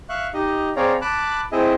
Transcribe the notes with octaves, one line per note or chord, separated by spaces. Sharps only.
E5 F5 C#6 F#6
D#4 G4 D#5
C4 G#4 C#5 D5 F5 A#5
A5 B5 D6 F#6
C4 E4 G#4 D#5 E5